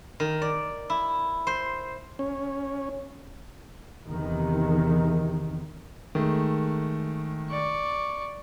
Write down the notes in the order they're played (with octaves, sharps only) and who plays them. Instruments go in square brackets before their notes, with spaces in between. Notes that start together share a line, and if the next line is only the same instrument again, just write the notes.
[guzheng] D#3
D5
E4
C5
[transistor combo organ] C#4
[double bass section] E2 C3 D#3
[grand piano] D#3 G#3 A3
[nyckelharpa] D5 C#6